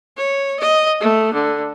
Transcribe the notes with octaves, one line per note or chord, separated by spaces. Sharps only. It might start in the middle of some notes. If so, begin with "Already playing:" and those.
C#5
D#5
A3
D3